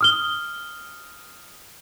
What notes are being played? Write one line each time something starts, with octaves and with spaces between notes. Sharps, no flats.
D#6 F6 G7